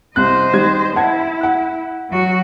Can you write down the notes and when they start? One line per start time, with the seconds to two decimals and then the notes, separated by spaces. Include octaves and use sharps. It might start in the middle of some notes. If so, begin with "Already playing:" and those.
0.16 C2 C5 D#5 F#6
0.54 D#3 G3 G#6
0.96 E4 F#5 A5 G#6
1.41 F#5 F#6
2.10 F#3 F#4